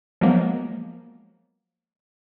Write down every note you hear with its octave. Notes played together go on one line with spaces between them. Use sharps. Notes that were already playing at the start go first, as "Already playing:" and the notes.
F3 F#3 G#3 A#3 B3